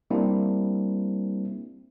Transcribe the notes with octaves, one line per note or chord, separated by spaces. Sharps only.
G3 A#3 C4 D4 E4